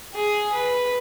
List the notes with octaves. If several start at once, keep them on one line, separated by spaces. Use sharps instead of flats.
G#4
B4